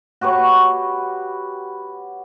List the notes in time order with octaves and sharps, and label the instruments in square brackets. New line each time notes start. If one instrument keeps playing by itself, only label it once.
[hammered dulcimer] F#4 G4 B4 C#5